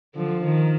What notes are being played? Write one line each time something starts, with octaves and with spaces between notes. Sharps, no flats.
D3 F3
D#3